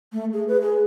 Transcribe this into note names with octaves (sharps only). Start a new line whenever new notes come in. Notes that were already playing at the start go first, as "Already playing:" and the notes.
A3
G#4
B4
G#4